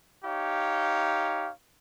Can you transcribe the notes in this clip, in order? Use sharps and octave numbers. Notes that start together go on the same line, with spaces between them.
D#4 G4 C#5 F5